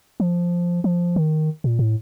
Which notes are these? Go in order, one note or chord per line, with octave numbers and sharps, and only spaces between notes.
F3
F3
D#3
A#2
A2